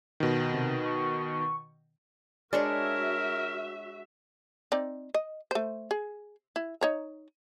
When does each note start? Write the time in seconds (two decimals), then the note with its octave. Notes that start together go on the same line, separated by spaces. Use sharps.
0.20 B2 D#3
0.53 C3
0.86 C#6
2.53 G#3 D4 F#4 A#4 C#5 D5 E5
4.72 C4 D#4 D5
5.14 D#5
5.51 A3 C5
5.91 G#4
6.56 E4
6.81 D#4 C#5 A#5